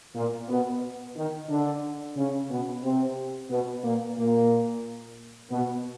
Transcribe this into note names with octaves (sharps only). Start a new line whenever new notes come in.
A#2 A#3
B2 B3
D#3 D#4
D3 D4
C#3 C#4
B2 B3
C3 C4
B2 B3
A#2 A#3
A#2 A#3
B2 B3